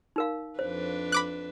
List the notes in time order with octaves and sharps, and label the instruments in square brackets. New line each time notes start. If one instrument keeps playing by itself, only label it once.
[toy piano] D#4 A#4 F5
[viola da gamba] F2 D4 B4 [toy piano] C5
[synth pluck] B5 D6 F#6